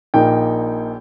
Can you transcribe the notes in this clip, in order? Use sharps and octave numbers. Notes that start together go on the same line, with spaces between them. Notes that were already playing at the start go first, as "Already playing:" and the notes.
A#1 A#2 A#3 D#4 G5